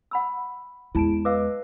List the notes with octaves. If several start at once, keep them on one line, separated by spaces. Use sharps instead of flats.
F#5 B5 E6
E2 G#3 E4 A5 D7
B4 D#5 F5 D6 E6